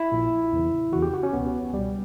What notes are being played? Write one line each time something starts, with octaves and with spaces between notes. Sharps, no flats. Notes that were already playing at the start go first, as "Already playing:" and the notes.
Already playing: E4
A#1 A#2
E2 C#3 E3
E2 C#3 E3 F#4
G4
F#4
C#4
C#2 B2 B3
C#2 B2 G3